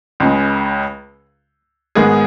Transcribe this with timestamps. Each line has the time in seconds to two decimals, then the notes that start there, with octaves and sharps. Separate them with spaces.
0.20 C#2 C#3 G#3
1.95 G#2 D#3 G#3 B3 G#4